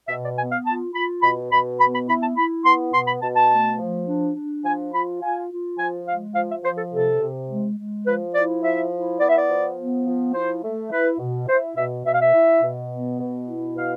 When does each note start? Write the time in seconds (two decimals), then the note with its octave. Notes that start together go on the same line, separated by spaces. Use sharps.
0.08 B2 E5
0.23 D5
0.37 B3 G#5
0.51 F5
0.66 F4 A5
0.94 F4 B5
1.22 B2 B5
1.51 B2 B5
1.80 B3 B5
1.94 B5
2.08 E4 B5
2.22 A5
2.36 E4 B5
2.65 B3 C6
2.93 B2 C6
3.07 B5
3.22 B2 A5
3.36 A5
3.51 A3
3.79 F3
4.07 D4
4.36 D4
4.64 F3 G#5
4.93 F4 B5
5.21 F4 G#5
5.50 F4
5.79 F3 G#5
6.07 G#3 F5
6.35 F3 F5
6.50 E5
6.64 F3 C5
6.78 A4
6.93 C3 A4
7.21 C3
7.49 G#3
7.78 G#3
8.06 F3 B4
8.35 E4 D5
8.63 F3 E5
8.92 E4
9.20 B3 D5
9.28 E5
9.38 D5
9.48 F3
9.77 B3
10.06 F3
10.34 E4 C5
10.63 A3
10.91 E4 B4
11.19 B2
11.48 E4 C5
11.76 B2 E5
12.05 B2 E5
12.13 F5
12.21 E5
12.33 E4
12.62 B2
12.91 B3
13.20 B2
13.48 E4
13.76 B2 F5